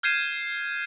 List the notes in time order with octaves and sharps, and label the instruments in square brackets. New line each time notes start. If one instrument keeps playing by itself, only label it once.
[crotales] F6 G6 G#6 C7 D#7 E7